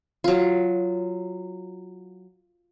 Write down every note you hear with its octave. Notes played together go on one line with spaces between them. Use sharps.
F#3 F4